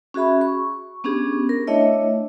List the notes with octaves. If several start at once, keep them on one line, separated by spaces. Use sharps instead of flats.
C#4 F#4 G#4 E5 B5
C#6
B3 C#4 D4 G4 G#4
A#4
A3 D4 E4 C#5 D#5 E5